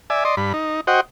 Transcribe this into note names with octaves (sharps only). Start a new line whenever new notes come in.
D5 E5 G#5
D5 D#5 C6
G2 B5
D#4
F#4 C5 D#5 F#5 G5